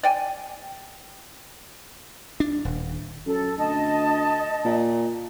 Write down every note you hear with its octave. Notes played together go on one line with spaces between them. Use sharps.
D5 G5 G#5
D4
D#1
F#2 A4
D2 D#5 A5
A#2